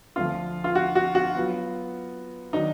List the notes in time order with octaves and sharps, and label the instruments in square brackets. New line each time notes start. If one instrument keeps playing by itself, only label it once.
[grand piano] D2 D3 F3 [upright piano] F4
[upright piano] F4
F#4
F#4
F#4
[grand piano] F#3 B3 F4
[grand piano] D#3 F#3 D4 [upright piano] D#4